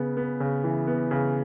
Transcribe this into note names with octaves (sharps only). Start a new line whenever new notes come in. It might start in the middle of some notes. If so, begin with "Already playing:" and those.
Already playing: C#3 B3
B3
C#3
E3
B3
C#3